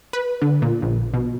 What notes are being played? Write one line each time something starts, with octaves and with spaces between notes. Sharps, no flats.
B4
D3
A#2
A#1
B2